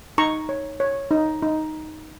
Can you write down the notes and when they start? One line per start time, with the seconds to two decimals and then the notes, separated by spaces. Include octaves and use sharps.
0.18 D#4 A#5 C#6
0.49 C#5
0.80 C#5
1.11 D#4
1.42 D#4